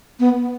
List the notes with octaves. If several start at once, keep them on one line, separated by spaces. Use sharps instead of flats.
B3